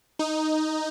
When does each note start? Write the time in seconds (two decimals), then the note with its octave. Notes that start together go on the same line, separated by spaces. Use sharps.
0.19 D#4